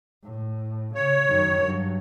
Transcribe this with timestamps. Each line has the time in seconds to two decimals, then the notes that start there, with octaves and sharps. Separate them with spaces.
0.23 A2
0.95 C#3 C#5
1.28 F#2 D#3
1.61 G2 F#3